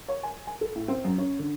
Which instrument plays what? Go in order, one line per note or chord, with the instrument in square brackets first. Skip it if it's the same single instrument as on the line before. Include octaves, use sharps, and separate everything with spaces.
[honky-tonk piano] C#5
G#5
G#5
A4
A2
C4
F#2
C#4
D3